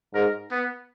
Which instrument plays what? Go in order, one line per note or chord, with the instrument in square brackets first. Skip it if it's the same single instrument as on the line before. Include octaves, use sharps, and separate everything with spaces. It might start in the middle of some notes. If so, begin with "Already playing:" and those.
[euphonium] G#2 [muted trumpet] A#4
[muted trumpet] B3